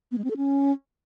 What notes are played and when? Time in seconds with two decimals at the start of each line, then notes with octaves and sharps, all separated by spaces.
0.12 B3
0.18 G#3
0.24 C4
0.30 A4
0.37 C#4